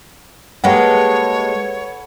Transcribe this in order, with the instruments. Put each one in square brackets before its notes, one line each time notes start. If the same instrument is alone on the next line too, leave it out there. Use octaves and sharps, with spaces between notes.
[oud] G#3 A#3 G4 [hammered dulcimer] A4 B4 [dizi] C#5 [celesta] F#5